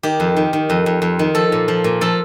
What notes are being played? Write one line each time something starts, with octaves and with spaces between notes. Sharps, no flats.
D#3 G4
F2
D#3
D#3
F2
F2
F2
D#3
F3 A4
A#2
F3
A#2
F3 A4